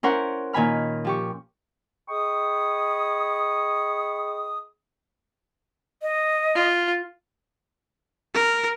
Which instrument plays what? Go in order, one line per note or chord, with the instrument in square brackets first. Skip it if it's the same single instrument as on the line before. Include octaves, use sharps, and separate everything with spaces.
[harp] C#4 E4 A#4 C5 F#5
A#2 D#3 G#5 B5 F6
F3 G4 C#6
[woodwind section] G#4 D#5 G5 B5 C#6 D#6
[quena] D#5
[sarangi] F4
[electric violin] A#4